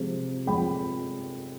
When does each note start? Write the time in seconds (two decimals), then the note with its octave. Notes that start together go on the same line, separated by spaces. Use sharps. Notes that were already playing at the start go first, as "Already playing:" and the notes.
Already playing: C3 F3 G#3
0.46 C3 F3 G#3 G5 B5